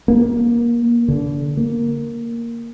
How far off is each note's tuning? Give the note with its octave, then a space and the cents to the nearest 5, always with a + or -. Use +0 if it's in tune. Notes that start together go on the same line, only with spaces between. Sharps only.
A#3 +20
D3 -30
A#3 -5